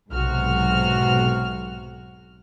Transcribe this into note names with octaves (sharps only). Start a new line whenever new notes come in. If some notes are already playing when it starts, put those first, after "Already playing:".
B1 G#2 C3 F#4 F6